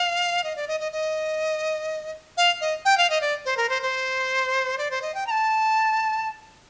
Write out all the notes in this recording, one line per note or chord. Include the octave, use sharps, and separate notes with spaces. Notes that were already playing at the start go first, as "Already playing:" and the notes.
Already playing: F5
D#5
D5
D#5
D#5
D#5
F5
D#5
G5
F5
D#5
D5
C5
A#4
C5
C5
D5
C5
D#5
G5
A#5
A5